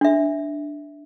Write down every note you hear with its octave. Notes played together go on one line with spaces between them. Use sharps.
D4 E5